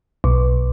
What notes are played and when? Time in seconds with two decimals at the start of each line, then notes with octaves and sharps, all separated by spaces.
0.24 B1